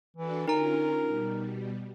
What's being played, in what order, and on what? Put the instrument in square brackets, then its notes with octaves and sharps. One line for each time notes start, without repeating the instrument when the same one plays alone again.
[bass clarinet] E3 [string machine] D4 F#4 A4
[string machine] D3 C#4 F4 [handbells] D#4 A#5 [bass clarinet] A#4
[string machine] B2 G3